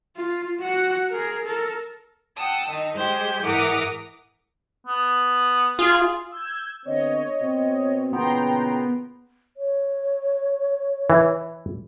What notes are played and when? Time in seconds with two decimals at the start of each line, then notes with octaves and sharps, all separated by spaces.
0.16 F4
0.60 F#4 F#5
1.11 G#4 A#4
1.45 A4 A#4
2.36 F#5 G5 A5 D#6 E6
2.67 D#3 D#4
2.96 G#3 G4 C5 G6 G#6
3.42 G#2 E3 A#4 F#5 D6 D#6
4.87 B3
5.79 F4 G#4
6.32 E6 G6 G#6
6.86 D3 B3 C4 C#5 D#5
7.40 B2 C4
8.13 A#2 C#3 E3 B3 G5 A#5 C6
9.57 C#5
11.10 E3